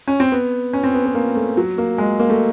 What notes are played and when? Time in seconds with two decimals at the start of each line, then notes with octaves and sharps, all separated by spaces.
0.08 C#4
0.20 C4
0.32 B3
0.73 C#4
0.83 C4
0.94 B3
1.06 B3
1.14 A#3
1.35 A3
1.57 F#3
1.78 A#3
1.98 G#3
2.20 A#3
2.30 A3